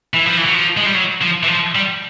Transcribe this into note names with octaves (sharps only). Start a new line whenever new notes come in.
E3
F3
E3
F#3
F3
G#3
G3
F#3
F3
E3
F3
G3